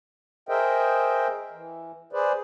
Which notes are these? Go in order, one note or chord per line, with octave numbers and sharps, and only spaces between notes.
G#4 A#4 C5 D#5 E5 G5
E3
G#4 B4 C5 D5